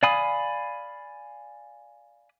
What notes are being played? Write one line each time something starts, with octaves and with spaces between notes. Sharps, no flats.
D5 F5 G#5 B5 D#6